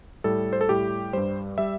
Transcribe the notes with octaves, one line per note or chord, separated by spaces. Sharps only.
A2 G3 A4
C5
A4
A2 G3 G4
G2 G3 C5
G3 E5